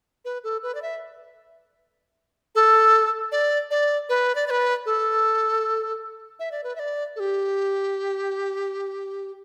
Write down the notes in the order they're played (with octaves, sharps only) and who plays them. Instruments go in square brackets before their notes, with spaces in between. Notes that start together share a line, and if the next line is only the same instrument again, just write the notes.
[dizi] B4
A4
B4
D5
E5
A4
D5
D5
B4
D5
D5
B4
A4
E5
D5
B4
E5
D5
A4
G4